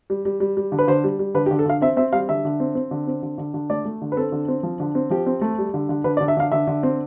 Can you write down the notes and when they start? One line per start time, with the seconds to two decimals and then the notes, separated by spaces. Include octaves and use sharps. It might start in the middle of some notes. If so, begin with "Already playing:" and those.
0.10 G3
0.25 G3
0.40 G3
0.57 G3
0.72 D3
0.79 B4
0.88 D3 C5
1.04 G3
1.19 G3
1.35 D3 B4
1.46 G4
1.51 D3
1.59 A4
1.66 D3 F5
1.82 C4 E5
1.97 C4 E5
2.13 G3 F5
2.29 D3 E5
2.45 D3
2.60 C4
2.75 C4
2.91 D3
3.07 C4
3.23 D3
3.38 D3
3.54 D3
3.70 A3 D5
3.85 A3
4.02 D3
4.12 B4
4.17 C4 A4
4.32 D3
4.48 C4
4.63 F3
4.80 D3
4.95 C4
5.10 F3 G4
5.27 C4
5.41 A3
5.58 G3
5.74 D3
5.89 D3
6.04 D3 B4
6.17 D5
6.21 D3
6.28 E5
6.37 D3 F5
6.52 D3 E5
6.67 D3
6.83 C4